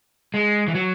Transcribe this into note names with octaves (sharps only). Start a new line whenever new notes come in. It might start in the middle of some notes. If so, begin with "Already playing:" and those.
G#3
E3
F#3